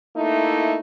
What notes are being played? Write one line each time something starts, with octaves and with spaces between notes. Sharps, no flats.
A3 A#3 D#4 E4